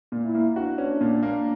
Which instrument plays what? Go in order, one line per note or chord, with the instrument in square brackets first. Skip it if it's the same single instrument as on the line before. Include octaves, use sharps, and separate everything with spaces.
[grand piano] A#2
[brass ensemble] E4
[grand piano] A#3
[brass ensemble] D4 [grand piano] F#4
[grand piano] C#4
A#2
A#3